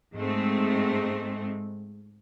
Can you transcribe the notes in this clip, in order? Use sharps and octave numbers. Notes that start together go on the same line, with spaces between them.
G#2 G#3 A3 C4